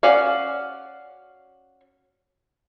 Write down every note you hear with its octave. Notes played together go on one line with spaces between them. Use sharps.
C#4 F#4 D5 F5